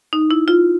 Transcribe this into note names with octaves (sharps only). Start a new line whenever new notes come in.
D#4
E4
F4